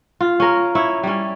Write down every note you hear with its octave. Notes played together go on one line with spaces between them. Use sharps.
F4
C#4 A#4
E4 C#5
G3 C#4